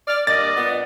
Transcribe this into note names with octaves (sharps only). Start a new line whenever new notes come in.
D5 F6
G3 A#3 D4 D5 D#5 A6
A#2 B3